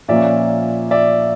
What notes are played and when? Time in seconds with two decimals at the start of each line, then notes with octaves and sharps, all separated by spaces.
0.08 A#2 F3 A#3 C#4 D5 E5
0.91 D5 E5